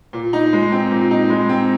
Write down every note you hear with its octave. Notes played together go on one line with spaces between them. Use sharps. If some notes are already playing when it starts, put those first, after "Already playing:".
A#2
D#4
G#3
C4
A#2
D#4
G#3
C4